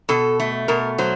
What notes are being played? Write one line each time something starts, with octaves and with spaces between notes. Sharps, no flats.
B2 A4
A3
B2 A#4
F#3 C5